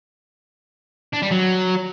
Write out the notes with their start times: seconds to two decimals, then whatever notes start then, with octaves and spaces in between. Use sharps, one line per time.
1.13 D4
1.22 G3
1.31 F#3